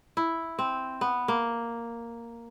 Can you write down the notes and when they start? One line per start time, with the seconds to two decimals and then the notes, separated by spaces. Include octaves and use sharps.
0.17 E4
0.59 C4
1.01 B3
1.28 A#3